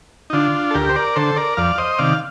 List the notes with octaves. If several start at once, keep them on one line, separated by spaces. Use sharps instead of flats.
D#4
D3 D4 F4
A4
D2 G4 A#4
C5
A#4 D5
D3 A4 C5
A#4 D5
F2 D5 F5
C5 D#5
C3 D#3 D5 F5